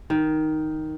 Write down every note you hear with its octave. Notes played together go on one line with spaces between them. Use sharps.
D#3